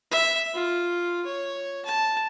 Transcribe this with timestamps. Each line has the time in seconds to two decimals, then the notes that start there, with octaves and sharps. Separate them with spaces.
0.11 E5
0.54 F4
1.25 C#5
1.85 A5